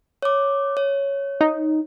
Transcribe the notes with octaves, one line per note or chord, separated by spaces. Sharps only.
C#5 D6
C#5
D#4